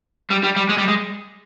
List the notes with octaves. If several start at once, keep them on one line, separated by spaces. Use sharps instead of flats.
G3
G3
G3
G#3
G3
G#3